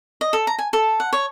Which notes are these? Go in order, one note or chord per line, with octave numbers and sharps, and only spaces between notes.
D#5
A4
A#5
G#5
A4
F#5
C#5